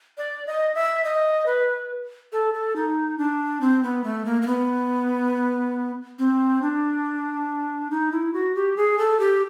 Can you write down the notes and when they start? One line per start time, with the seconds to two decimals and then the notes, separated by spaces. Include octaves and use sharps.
0.18 D5
0.47 D#5
0.75 E5
1.04 D#5
1.46 B4
2.32 A4
2.54 A4
2.76 D#4
3.18 D4
3.61 C4
3.83 B3
4.04 A3
4.25 A#3
4.42 A#3
4.47 B3
6.19 C4
6.62 D4
7.90 D#4
8.12 E4
8.34 F#4
8.55 G4
8.77 G#4
8.98 A4
9.20 G4